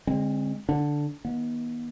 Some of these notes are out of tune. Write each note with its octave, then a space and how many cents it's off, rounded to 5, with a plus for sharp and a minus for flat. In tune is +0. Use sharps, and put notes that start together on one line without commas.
D3 -30 G#3 -20 C4 +25
D3 +0 D4 +0
D#3 +20 B3 -40